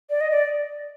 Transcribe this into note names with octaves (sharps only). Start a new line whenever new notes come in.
D5
D#5
D5